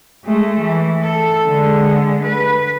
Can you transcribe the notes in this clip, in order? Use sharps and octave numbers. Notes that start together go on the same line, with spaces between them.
G#3 A3
E3
A4
D3 G#3
B4